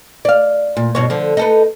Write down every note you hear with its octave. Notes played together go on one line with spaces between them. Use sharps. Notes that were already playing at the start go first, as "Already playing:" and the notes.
D5 F5
A#2
G2 B2 C#5
D3 F3
D#4 A4 B4